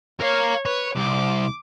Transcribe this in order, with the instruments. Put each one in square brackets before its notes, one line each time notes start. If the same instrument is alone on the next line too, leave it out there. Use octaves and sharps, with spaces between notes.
[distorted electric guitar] A#4 F5 [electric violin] C#5
[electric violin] B4 [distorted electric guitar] C#5
[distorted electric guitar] C2 [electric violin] D6